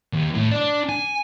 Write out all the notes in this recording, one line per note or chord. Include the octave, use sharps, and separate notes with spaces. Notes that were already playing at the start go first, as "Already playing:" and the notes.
D#2
A2
D4
G#5